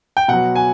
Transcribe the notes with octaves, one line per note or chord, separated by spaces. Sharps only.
G5
B2 F#3 F#5
G#5